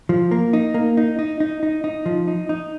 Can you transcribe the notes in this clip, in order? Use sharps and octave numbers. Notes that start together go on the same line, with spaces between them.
F3
A#3
D#4
A#3
D#4
D#4
D#4
D#4
D#4
F3
D#4
D#4